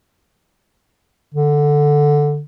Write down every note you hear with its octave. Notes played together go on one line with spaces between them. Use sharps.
D3